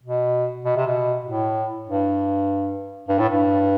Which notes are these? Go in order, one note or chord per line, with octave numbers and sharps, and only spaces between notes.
B2
B2
C3
B2
A2
G2
G2
A2
G2